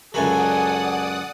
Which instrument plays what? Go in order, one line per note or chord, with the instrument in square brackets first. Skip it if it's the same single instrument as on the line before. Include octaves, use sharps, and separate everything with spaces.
[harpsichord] C#2 F#2 F#3 [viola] A4 G#5 [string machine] D5 F#5 D#6